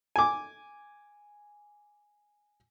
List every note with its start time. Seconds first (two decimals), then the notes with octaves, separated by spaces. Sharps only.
0.16 G#5 D6